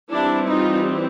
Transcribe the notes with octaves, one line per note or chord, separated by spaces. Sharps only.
E3 G3 C4 D4 E4
D#4 F4